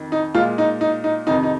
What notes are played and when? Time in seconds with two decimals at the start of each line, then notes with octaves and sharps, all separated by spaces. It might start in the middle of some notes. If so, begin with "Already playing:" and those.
Already playing: F2 D#3
0.12 D#4
0.34 A#2 G#3 F4
0.58 D#4
0.81 D#4
1.04 D#4
1.27 F2 C3 D#3 D#4
1.43 D#4